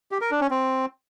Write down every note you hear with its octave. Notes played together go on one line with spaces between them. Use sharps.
G4
A#4
D4
C#4
C4